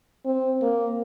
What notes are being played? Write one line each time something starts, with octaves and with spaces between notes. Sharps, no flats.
C4
A#3